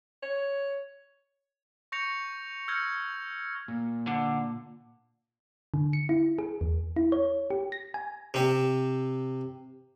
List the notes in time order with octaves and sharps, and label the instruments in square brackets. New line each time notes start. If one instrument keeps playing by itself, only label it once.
[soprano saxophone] C#5
[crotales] C#6 G6 A#6 C#7 F7
E6 F6 G6 G#6 A#6 C#7
[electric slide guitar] A#2
[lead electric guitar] D3
[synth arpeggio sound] D3
C#7
E4
G#4
E2
E4
C#5
G4
A#6
G#5
[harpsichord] C3 C4